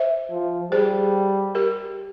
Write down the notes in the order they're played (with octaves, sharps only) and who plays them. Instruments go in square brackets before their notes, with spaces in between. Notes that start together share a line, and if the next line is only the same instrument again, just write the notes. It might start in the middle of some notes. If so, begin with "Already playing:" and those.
Already playing: [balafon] C5 E5
[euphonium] F3
[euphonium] G3 [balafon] G#4 C5
[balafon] G4 A#4